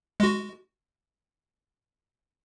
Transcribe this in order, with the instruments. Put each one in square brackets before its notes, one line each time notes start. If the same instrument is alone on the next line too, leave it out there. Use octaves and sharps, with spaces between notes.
[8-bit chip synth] G#3 F#4